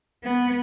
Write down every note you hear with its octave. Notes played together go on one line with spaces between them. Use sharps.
B3